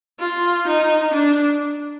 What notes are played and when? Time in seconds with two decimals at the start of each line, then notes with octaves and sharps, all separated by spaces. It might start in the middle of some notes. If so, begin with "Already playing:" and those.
0.19 F4
0.67 D#4
1.14 D4